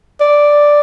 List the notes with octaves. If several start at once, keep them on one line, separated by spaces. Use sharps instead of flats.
D5